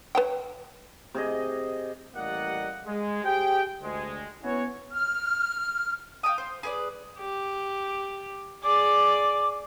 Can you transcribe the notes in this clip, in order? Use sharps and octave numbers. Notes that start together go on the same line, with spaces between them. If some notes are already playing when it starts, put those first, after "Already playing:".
B4 C#5 G5
C3 G#4 D#5
A1 G3 A#3 D5 D#5 F#5
G#3
G4 G#4 C5 G5
D2 G#3
B3 C#4 E4 F#4 C#5
F6
F5 G5 A5 D#6
C5
G#4 B4 D5
G4
G#4 D5 D6